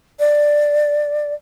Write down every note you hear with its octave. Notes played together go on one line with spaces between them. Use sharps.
D5